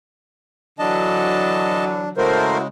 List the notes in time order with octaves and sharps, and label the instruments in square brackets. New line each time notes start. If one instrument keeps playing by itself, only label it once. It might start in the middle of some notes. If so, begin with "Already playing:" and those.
[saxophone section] D3 E3 F#3 [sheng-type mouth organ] D4 [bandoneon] D#5 A5
[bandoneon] C#3 G#3 [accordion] A3 A#4 C5 [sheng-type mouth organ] E4 F#4